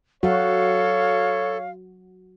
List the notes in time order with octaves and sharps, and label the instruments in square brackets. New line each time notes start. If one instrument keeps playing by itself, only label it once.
[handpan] F#3 F#4 [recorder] A4 [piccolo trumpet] C#5 [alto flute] F5